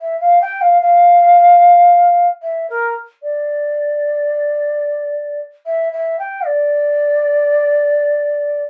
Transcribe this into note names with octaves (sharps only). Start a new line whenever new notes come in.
E5
F5
G5
F5
F5
E5
A#4
D5
E5
E5
G5
D5